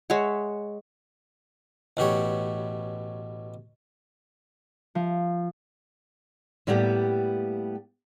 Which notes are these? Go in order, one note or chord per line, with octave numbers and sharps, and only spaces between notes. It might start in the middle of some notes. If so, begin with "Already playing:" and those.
G#3 C#5 E5 F#5
A1 B2 G4 C#5
F3
A2 G3 A#3 B3 D4 G4